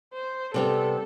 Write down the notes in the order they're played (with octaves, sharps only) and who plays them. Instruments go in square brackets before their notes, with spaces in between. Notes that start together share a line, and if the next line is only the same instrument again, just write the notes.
[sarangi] C5
[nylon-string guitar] C3 G3 B3 [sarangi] A4